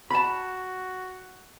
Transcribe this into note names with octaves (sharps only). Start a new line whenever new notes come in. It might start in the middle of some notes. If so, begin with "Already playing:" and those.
F#4 A5 B5